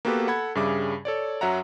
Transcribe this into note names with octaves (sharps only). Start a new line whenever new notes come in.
A#3 B3 F#4 G4 A4 B4
A4 F#5 B5 G#6
G2 C#3 G3 G#4 E5 D6
A4 C#5 D5
F#2 F#3 E5 F#5 A#5